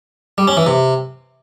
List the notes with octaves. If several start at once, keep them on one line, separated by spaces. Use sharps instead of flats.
G3
C#4
E3
C3